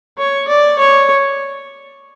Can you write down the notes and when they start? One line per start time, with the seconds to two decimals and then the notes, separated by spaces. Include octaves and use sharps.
0.18 C#5
0.48 D5
0.79 C#5